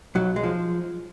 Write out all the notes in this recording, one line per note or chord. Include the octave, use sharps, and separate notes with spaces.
B1 F#3
G#3
F3